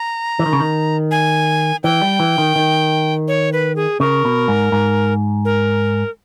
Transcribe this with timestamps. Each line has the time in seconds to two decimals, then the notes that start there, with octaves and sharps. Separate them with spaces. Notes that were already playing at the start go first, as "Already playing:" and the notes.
Already playing: A#5
0.39 E3
0.46 D#3
0.53 C#3
0.60 D#3
1.11 G#5
1.84 E3 G5
2.02 G3
2.20 E3
2.38 D#3
2.56 D#3
3.28 C#5
3.53 B4
3.76 G#4
4.00 C#3 A#4
4.25 B2
4.48 G#2
4.72 G#2
5.45 A#4